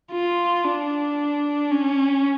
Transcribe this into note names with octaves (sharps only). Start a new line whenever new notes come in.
F4
D4
C#4